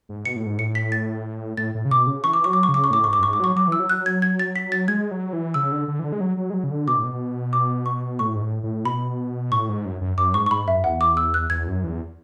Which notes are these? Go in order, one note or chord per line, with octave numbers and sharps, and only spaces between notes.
G#2
B2 C#7
A2
G#2
A2 C#7
B6
A6
A2 A6
A2
C#3
B2 D6
C#3
E3 C#6
D6
F#3 C#6
D6
C#6
C#3
D6
C#6
A2 D6
G#2 C#6
D6
F#2
G#2 C#6
D6
F#3 C#6
F#3 D6
E3 E6
F#3
F#6
G#6
G#6
A6
B6
A6
G#3 G#6
F#3
E3
C#3 E6
D3
D3
E3
D3
G#3
F#3
F#3
G#3
F#3
C#3
D3
B2 D6
A2
B2
D6
C#6
A2 C#6
G#2
A2
A2
B2 B5
A2 C#6
G#2
F#2
F#2
F#2 D6
G#2 C#6
C#6
G#2 B5
F#2 E5
E2 F#5
D6
E6
F#6
E2 G#6
F#2
E2